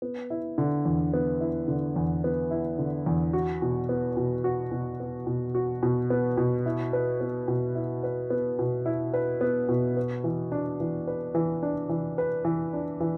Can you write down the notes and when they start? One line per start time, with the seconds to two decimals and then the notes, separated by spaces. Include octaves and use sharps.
0.02 B3
0.30 E4
0.58 D3
0.85 E2
1.14 B3
1.41 E4
1.68 D3
1.96 E2
2.24 B3
2.51 E4
2.79 D3
3.06 E2
3.33 F#4
3.62 B2
3.89 B3
4.17 B2
4.44 F#4
4.72 B2
5.00 B3
5.27 B2
5.55 F#4
5.83 B2
6.10 B3
6.37 B2
6.66 E4
6.93 B4
7.21 B3
7.48 B2
7.75 E4
8.04 B4
8.30 B3
8.59 B2
8.86 E4
9.14 B4
9.41 B3
9.69 B2
9.97 B4
10.24 E3
10.52 D4
10.80 E3
11.07 B4
11.35 E3
11.63 D4
11.89 E3
12.18 B4
12.45 E3
12.73 D4
13.00 E3